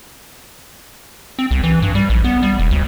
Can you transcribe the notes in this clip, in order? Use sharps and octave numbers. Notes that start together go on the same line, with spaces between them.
C4
C2
E3
G2
G3
A#1
B3
G3
E1
D2